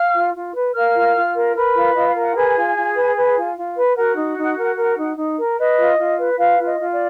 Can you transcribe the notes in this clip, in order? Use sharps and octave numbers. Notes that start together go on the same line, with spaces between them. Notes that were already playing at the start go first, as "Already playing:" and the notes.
Already playing: F5 F6
F4
F4
B4
A#4 F5 F6
F4
F4
A#4
A#4 B4 B5
F4
F4 D#5
F5
A#4
F#5
G#4 B4 G#5
F4
F4
B4
B4
F4
F4
B4
F#4 A#4 F#5
D#4
D#4
A#4
A#4
D#4
D#4
A#4
B4 D#5
F4
F4
B4
F4 B4 F5
F4
D#5
F4
D5